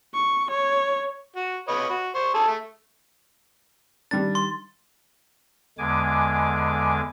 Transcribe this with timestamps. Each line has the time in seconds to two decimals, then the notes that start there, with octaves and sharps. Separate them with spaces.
0.14 C#6
0.51 C#5
1.36 F#4
1.68 B4 C#5 D#5
1.90 F#4
2.15 C5 C#6
2.34 G#4 A4 A5
2.47 A3
4.11 D#3 G3 D4 A6
4.35 C6
5.78 E2 D3 G#3 G#5 D6